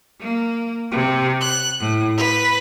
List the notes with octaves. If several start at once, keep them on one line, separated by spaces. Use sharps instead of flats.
A#3
C3
F#6
A2
B4